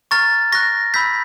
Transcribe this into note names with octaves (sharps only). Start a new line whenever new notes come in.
A#5 C#6 F6 A6
C#6 F#6 A#6
B5 E6 G6 B6